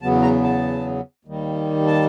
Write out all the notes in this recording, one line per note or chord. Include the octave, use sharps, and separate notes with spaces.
E2 C#3 F#3 B3 A5
A#5
A5
D#2 D#3 G3
A5